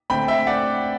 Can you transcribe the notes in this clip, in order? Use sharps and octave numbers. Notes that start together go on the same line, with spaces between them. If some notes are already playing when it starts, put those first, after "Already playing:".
D3 A3 C4 G5 B5
E5 G5
D5 F#5